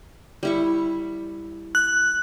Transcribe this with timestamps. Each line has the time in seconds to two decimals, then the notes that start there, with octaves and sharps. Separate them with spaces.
0.43 G3 E4 C#6
1.75 F#6